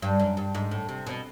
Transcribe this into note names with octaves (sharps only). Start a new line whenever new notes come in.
G2
F#2
G2
G#2
A2
C3
B2